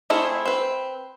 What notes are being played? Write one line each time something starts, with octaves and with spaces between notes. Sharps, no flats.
A3 C4 E4 F4 G#4
C4 B4